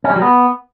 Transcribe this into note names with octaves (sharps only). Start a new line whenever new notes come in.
C#4
G3
F#3
B3